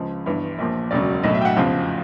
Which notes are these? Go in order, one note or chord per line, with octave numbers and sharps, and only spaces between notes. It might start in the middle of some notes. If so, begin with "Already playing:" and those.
Already playing: C#2 C#3 F3
G1 G2 E3
A#1 A#2 F3
E1 D2 C#3 F#3 D5
B1 A2 F#3 D#5
E5
G5
F#5
F1 E2 C#3 F3 F5